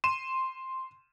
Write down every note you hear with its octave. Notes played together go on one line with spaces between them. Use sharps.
C6 D#7 E7